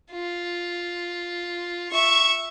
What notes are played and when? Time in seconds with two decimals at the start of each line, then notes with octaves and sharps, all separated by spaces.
0.12 F4
1.91 E5 C#6